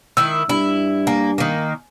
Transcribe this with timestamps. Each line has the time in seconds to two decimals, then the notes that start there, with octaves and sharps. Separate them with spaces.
0.17 D#3 E4 E6
0.49 G2 E4
1.07 A#3 G#5
1.38 D#3 A#3